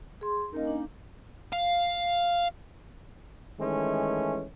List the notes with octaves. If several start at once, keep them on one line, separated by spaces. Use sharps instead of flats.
G#4 C6
A#3 C#4 D#4 A#4 D#5
D4
F5
D#3 E3 G#3 A3 C#4